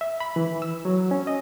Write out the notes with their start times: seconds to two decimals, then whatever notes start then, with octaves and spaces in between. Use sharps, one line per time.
0.01 E5
0.20 B5
0.36 E3
0.62 E6
0.85 F#3
1.11 C#4
1.27 D#5